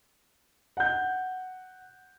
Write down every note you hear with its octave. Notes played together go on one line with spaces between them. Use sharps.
F#5 G6